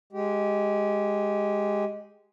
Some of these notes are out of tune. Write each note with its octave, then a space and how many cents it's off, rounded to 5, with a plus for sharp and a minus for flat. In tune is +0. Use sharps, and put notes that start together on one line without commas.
G#3 +0 G4 -15